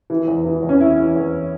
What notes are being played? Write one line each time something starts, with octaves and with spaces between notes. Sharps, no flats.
E3
E2
E3
E2
C#4
E3 E4
E3
E2